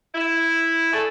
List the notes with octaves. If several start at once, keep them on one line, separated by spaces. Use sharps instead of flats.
E4
A3 D4 G#4 A4